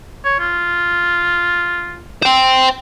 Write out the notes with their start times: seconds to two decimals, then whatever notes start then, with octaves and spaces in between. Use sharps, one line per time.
0.25 C#5
0.40 F4
2.22 C5 G5